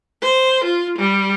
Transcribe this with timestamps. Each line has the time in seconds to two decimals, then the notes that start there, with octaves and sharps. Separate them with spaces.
0.21 C5
0.64 F4
0.98 G3